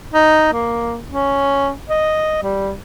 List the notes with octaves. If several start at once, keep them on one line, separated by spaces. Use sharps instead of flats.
D#4
A#3
C#4
D#5
G3